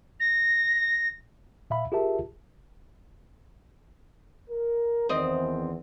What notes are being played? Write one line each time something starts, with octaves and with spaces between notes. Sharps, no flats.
A#6
A#2 E5 F5 B5
F4 G4 G#4 A#4 E5 A5
A#4
E2 D#3 C4 D#5